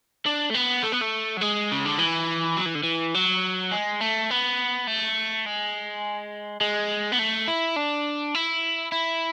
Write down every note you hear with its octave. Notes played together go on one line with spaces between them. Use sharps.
D4
A3
B3
A3
B3
A3
F#3
G#3
C#3
D3
E3
F#3
E3
D3
E3
F#3
G#3
A3
B3
A3
G#3
G#3
B3
A3
E4
D4
E4
E4